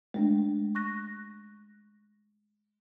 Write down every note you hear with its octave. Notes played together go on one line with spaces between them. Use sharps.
G#3 A3 D4
C#6 F#6 A#6